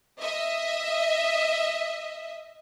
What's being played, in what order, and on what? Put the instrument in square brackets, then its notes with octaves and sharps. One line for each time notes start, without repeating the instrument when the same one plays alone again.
[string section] D#5 E5